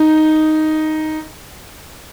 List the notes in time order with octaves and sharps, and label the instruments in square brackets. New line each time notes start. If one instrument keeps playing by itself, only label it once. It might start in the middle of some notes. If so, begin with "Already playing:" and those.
Already playing: [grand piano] D#4